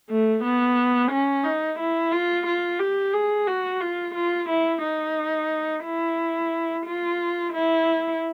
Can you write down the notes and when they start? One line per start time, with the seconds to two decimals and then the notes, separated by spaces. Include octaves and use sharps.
0.10 A3
0.44 B3
1.11 C#4
1.44 D#4
1.79 E4
2.12 F4
2.47 F4
2.80 G4
3.14 G#4
3.47 F#4
3.81 F4
4.15 F4
4.49 E4
4.83 D#4
5.84 E4
6.86 F4
7.53 E4